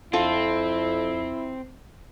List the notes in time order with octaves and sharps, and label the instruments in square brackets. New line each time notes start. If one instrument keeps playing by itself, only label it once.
[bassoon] F2 [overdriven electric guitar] C4 [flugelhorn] E4 [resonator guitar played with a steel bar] F4 A4